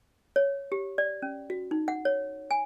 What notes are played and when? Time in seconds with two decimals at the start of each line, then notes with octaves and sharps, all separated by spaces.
0.36 C#5
0.72 G4
0.98 D5
1.22 C#4
1.50 F#4
1.71 D#4
1.88 F#5
2.05 C#5
2.51 G#5